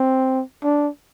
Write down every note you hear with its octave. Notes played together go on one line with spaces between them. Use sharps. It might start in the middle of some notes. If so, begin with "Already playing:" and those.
Already playing: C4
D4